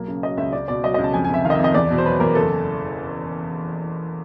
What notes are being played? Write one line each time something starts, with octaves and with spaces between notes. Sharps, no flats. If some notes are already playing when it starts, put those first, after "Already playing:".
Already playing: B1 A#3
C#3
F#3 D#5
C#2 E5
C#2 D5
B2 D5
F#3 D#5
D#5
C#2
A5
F2 G#5
G#5
C3 E5
D#3 F5
D#5
E5
F2
D#5
E2 D5
B2
C5
F#3 B4
E2 A#4
F#1 A4